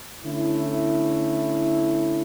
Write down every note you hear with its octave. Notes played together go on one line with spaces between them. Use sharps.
D3 A3 C#4 E4